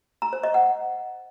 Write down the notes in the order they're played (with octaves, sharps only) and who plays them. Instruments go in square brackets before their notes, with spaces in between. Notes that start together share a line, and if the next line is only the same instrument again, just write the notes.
[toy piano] A#5
C5
D#5
F#5